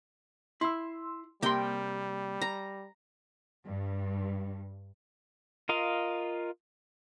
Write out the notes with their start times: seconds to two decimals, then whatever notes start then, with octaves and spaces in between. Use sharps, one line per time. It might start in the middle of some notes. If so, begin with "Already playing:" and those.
0.61 E4 C6 E6
1.42 C3 G3 A#3 A#4 G5 C6
2.42 A#5
3.65 G2
5.69 F4 A#4 D#5 F5